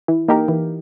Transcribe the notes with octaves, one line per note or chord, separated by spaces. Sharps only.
E3
A#3 D#4 G4 A#4
E3